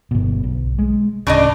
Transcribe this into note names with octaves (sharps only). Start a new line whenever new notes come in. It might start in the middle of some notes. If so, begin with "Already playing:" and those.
G1 B2
B1
G#3
D1 C#3 D4 D#5